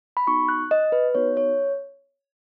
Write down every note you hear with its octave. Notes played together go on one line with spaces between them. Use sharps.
B5
B3 D#4 F#4 C#6
F#6
D#5
B4
B3 D#4 F#4 C#5
C#5